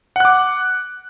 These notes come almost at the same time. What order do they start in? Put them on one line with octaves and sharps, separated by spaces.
F#5 F#6 D6